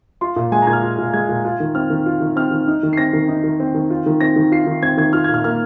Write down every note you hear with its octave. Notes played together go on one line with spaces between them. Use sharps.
F4 C6
A#2
G#3 G#5
A#5
A#2 G#6
F6
F4
A#2
G#3 G#6
A#2
F4
D#3
C4 F6
D#3
F4
D#3
C4 F6
D#3
D#4
D#3
C7
C4 A#6
D#3
D#4
D#3
C4
D#3
F4
D#3
C4 A#6
D#3
F4 C7
D#3
C4 G#6
D#3 G#6
F4 F6
G#6
A#2
F6
A#3 F6